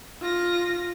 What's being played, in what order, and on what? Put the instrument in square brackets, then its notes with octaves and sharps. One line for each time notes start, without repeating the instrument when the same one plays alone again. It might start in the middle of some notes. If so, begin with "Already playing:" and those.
[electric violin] F4 A#6